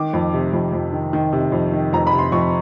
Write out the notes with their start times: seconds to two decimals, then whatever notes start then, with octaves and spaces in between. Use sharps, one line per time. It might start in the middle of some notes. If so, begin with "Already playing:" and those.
Already playing: D#3 D6
0.13 F2
0.33 C3
0.53 F2
0.73 F2
0.93 D#3
1.13 D#3
1.33 C3
1.52 F2
1.72 D#3
1.93 F2 A#5
2.07 C3 B5
2.19 C6
2.32 F2 C#6